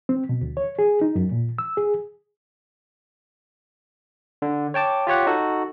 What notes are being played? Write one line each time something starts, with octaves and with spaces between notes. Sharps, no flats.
C4
B2
D2
C#5
G#4
D#4
F#2
A#2
E6
G#4
D3
C#5 G5 A5 D6
F4 G4 C#5 F#5
D#4 F#4 A4